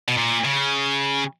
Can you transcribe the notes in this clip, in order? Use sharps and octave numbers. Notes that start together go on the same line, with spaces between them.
B2
A#2
C#3